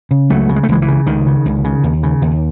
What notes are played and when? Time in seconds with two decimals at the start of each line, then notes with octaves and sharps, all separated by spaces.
0.11 C#3
0.30 C#2 F#3 A3
0.49 C#3
0.56 G#3
0.63 A3
0.69 C#2 E3 G#3
0.82 E3
0.88 C#3
1.06 C#2 D#3
1.27 C#3
1.46 C#2
1.64 C#3
1.83 D#2
2.03 C#3
2.22 D#2